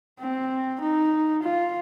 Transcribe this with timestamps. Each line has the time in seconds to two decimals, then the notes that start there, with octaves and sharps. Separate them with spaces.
0.20 C4
0.81 D#4
1.43 F4